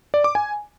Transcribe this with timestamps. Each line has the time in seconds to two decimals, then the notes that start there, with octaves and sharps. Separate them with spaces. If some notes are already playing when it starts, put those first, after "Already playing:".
0.14 D5
0.24 D6
0.35 G#5